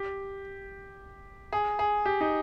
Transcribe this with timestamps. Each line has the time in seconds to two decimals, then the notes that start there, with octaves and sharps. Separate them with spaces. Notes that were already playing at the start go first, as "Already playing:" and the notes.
Already playing: G4
1.53 G#4
1.79 G#4
2.06 G4
2.21 D#4